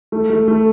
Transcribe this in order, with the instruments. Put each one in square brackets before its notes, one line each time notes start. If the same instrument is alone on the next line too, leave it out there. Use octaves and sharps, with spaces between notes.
[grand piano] A3
A3
A3